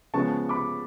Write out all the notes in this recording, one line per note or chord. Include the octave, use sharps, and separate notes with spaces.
C#3 F3 G#3 B3 A5 C#6
B5 D6